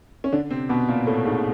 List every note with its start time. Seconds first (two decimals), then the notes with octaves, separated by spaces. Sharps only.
0.24 C#4
0.32 D3 D4
0.50 C3 C4
0.69 B2 B3
0.88 A#2 A#3
1.07 A2 A3
1.25 G#2 G#3